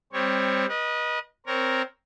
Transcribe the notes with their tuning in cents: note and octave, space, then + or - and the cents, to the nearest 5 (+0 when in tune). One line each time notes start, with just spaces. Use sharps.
G3 +20 C4 +0 C#5 +0
B4 -35 D#5 +0
C4 +0 A#4 +0 C#5 +20